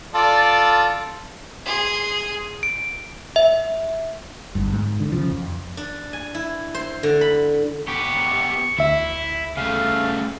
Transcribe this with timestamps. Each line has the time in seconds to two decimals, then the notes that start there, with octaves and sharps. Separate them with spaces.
0.14 F4 A4 D5
1.65 G#4 C6
2.63 D7
3.36 E5
4.55 G1 G2
4.73 G#2
5.00 D3
5.12 C#3 F3
5.31 F2
5.77 D4
6.13 G#5
6.35 E4
6.74 C5
7.03 D3
7.21 B5
7.88 B3 G4 C#6
8.78 D2 E4 E5
9.57 C#3 A3 F5